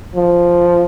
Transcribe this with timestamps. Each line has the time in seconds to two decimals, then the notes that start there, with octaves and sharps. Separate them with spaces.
0.16 F3